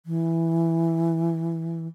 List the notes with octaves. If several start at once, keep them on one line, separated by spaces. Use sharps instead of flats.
E3